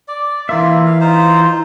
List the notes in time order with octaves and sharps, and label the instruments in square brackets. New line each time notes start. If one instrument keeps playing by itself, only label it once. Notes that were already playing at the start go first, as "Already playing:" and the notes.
[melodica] D5
[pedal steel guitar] E3 E5 [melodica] A#3 F4
[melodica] F5
D#4 F4 C5
D#4